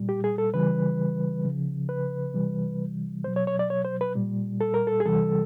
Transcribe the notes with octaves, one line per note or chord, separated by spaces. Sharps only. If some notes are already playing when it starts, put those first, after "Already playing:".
Already playing: A#2 G3
G4
G#4
A4
C#3 E3 G3 B4
C#3 F3
B4
C3 E3 G3
B2 F#3 C5
C#5
C#5
D5
C#5
C5
B4
A#2 G3
A4
A#4
A4
G#4
C3 E3 G3 A4